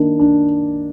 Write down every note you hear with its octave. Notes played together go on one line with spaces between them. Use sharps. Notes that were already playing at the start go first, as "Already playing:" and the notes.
Already playing: D#3 A#3 D4
D4